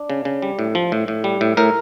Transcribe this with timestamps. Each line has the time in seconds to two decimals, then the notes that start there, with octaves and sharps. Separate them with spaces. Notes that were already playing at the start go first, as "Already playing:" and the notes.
Already playing: D4
0.10 C#3
0.25 C#3
0.42 G3
0.59 A2
0.75 F3
0.92 A2
1.08 A2
1.24 G3
1.41 A2
1.57 A2 A#4